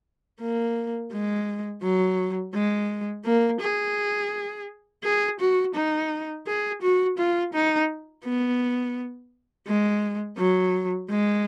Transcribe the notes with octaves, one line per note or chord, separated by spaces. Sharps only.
A#3
G#3
F#3
G#3
A#3
G#4
G#4
F#4
D#4
G#4
F#4
F4
D#4
B3
G#3
F#3
G#3